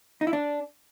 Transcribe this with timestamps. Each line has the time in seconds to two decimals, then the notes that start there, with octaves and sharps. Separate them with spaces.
0.21 D#4
0.27 E4
0.33 D4